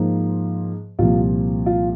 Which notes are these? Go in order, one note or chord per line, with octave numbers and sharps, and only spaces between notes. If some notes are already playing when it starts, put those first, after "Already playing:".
Already playing: G#2 F3 A#3
C2 A#2 F3 F4
F4